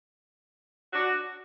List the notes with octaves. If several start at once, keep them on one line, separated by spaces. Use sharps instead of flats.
D4 F#4